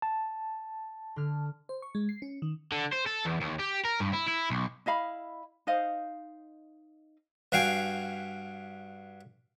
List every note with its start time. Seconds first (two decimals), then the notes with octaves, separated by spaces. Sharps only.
0.02 A5
1.16 D3 F6
1.69 C5
1.82 C#6
1.95 G#3
2.09 C7
2.22 C#4
2.42 D#3
2.72 D3
2.93 C5
3.07 A4
3.26 E2
3.41 D#2
3.59 G4
3.85 A#4
4.00 G2
4.13 E4
4.28 E4
4.50 B1
4.86 E4 D#5 F5 B5
5.67 D#4 C5 D#5 F5
7.52 G2 F#4 F5 G5 G#5